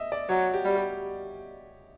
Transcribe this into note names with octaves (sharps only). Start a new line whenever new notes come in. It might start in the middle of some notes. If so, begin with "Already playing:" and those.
Already playing: D#5 E5
D5
F#3 C#5
G4
G3
G4